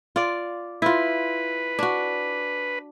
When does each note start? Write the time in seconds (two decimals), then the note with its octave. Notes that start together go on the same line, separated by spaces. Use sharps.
0.16 F4 D5
0.82 E4 F4 B4
1.79 D4 F#4